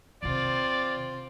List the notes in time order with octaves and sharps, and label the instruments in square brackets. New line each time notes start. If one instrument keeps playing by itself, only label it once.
[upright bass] D#2 C3 [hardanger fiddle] C4 F4 [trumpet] D5